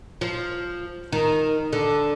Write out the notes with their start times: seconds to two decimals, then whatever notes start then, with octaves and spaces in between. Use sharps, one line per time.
0.21 F3
1.12 D#3
1.73 D3